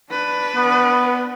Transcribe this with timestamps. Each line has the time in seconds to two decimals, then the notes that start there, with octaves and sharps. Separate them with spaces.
0.11 D4 B4
0.56 B3